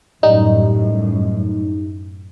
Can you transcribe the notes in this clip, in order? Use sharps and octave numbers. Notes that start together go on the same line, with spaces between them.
F#2 A2 G3 D#4